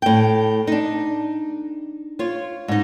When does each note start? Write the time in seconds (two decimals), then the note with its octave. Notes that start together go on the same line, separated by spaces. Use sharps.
0.02 A2 G5
0.67 D4 D#4
2.19 F4 C#5
2.68 G#2 D#4